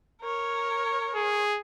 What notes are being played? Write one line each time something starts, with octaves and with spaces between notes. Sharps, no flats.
A#4 C#5
G#4